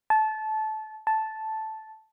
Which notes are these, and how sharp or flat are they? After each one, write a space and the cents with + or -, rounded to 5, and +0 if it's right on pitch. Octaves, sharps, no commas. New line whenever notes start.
A5 -20
A5 -5